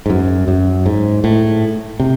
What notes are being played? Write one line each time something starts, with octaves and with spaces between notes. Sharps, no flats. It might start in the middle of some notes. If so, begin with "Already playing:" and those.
G#2
F#2
F#2
G#2
A2
C3